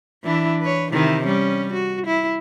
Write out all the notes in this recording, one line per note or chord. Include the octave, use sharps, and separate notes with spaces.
E3 D4 E4
B4 C#5
C3 D#3 E4
G3 C#4
F#4
E4